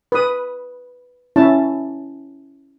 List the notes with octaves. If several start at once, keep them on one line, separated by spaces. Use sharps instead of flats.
B4 D#6
C#4 E4 A5